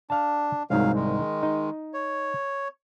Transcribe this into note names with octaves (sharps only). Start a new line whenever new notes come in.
D4 F5 A5
C2 G#2 D#3 F#3 F5
D#3 G#3
D#4
C#5